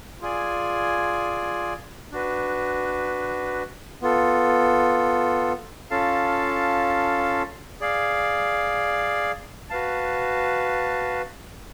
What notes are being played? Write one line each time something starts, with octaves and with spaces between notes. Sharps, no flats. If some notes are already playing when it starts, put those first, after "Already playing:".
F4 G#4 D5 G#5
D4 F#4 B4
B3 F4 A4
C#4 F4 A4 F5 A5
G#4 D5 F5
F#4 B4 F5 A5